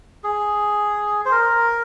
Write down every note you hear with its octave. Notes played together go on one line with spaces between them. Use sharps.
G#4
C5
A#4